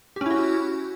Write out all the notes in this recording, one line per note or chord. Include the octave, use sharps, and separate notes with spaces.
C#4 E4 F#4 G4